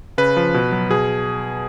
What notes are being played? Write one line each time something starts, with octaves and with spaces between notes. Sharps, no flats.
C#3 B4
F3
B2
F#3
B2 G#4